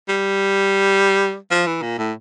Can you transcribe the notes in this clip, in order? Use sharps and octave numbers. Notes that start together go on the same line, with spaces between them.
G3
F3
E3
A#2
A2